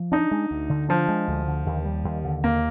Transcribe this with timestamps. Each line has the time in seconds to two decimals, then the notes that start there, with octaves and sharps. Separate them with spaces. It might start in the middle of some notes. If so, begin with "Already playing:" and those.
Already playing: F3
0.12 D4 D#4
0.31 G#3
0.51 D2
0.70 D3
0.89 F3 D4
1.08 G#3
1.28 D2
1.48 D3
1.66 D#2
1.85 G3
2.04 D#2
2.25 D3
2.43 D#2 A#3